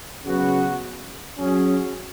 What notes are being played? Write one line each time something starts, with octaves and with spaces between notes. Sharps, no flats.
C#3 F#3 B3 F#4
F#3 C#4 G#4